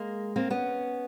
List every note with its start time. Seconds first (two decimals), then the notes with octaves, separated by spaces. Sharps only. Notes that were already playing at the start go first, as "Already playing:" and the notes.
Already playing: G#3 A#3
0.36 A#3 C4
0.51 B3 C#4